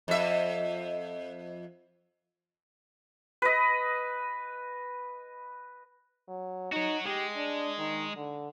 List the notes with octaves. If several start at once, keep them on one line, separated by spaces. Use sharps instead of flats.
F2 E5
B4 D#5
F#3
D#4 F#4 C#5
G#3 G4
D4
D#3
D3